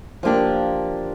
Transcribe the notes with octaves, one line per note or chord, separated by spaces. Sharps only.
F3 A#3 D4 G4